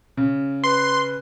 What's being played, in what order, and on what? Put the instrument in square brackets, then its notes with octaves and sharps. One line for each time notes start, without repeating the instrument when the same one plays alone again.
[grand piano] C#3
[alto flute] B4 [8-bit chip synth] C6